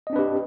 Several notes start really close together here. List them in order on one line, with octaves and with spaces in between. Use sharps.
D#5 C4 D4 B4 G4